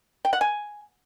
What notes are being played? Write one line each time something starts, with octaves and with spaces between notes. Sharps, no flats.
G5
F#5
G#5